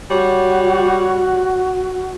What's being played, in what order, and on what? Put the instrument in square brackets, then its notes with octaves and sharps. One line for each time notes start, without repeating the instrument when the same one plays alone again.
[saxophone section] G3 C#5 [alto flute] F#4